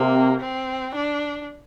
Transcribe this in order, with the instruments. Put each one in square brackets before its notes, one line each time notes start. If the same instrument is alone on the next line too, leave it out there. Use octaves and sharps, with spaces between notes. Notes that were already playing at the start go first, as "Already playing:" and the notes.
Already playing: [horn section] C3 [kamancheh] A#3
[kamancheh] C4
D4